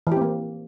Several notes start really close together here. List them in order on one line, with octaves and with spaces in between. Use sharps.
E3 G4 C4 A#3